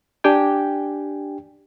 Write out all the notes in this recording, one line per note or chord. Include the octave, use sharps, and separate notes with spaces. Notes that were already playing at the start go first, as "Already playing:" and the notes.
D4 G4 G5 G#5